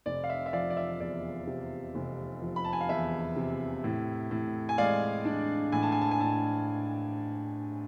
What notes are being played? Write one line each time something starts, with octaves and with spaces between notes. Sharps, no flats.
F1 D5
F5
E5
E5
F3 D5 F5
D5
E5
E2 D5
C3
F1
F3
B5
A5
G#5
F5
E2 E5
C3
A2
A2
G#5
G#3 D5 F5
D4
A2 G#5
A5
G#5
A5
G#5
A2 A5